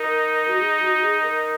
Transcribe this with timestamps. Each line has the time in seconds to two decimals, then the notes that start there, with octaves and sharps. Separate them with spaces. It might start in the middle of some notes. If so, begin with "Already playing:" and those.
Already playing: D#4 A#4
0.48 F#4
0.59 G#4
0.80 F#4
0.93 F#4
1.02 G#4
1.22 A#4